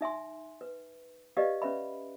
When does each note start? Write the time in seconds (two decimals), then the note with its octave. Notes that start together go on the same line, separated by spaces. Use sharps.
0.01 D#4 E5 G#5 C6
0.61 B4
1.37 G4 B4 D5 D#5 F5
1.62 C#4 B4 E5 B5